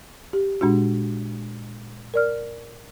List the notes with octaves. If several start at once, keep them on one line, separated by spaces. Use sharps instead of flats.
G4
A#2 G#3 D4 F#4
A#4 D5 F6